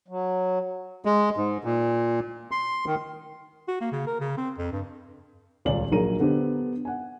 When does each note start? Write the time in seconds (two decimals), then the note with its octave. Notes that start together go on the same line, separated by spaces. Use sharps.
0.08 F#3
1.05 G#3
1.37 G#2
1.64 A#2
2.51 C6
2.86 D#3
3.68 F#4
3.81 A#3
3.92 C#3
4.07 A#4
4.20 C#3
4.38 C4
4.58 F2
4.72 G2
5.65 D#1 C#2 C#5 D5 G#5 F#7
5.92 A#1 F#3 A#3 G#4 A#5 D#7
6.19 D3 B3 D4 G4 C5
6.85 F#5 G#5